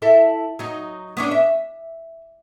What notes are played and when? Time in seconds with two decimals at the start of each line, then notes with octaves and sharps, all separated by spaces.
0.02 E4 A4 E5
0.59 F#3 D#4
1.17 B3 C#4 D4
1.31 E5